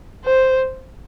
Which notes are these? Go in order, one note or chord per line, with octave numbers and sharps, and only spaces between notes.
C5